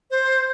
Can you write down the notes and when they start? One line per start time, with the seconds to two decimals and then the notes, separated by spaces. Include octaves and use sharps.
0.11 C5